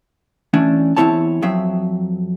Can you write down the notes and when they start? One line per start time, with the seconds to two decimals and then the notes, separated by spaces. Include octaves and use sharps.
0.53 E3 A3 C#4 D4
0.97 E2 E3 C4 E4 C#5 A5
1.42 F2 F#3 C4 E5